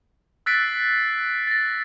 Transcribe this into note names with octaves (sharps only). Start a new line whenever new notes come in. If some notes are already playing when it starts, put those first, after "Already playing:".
E6 F#6 A6 B6 C7 D7
A6 A#6